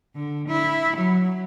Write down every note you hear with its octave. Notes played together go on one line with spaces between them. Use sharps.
D3
E4
F#3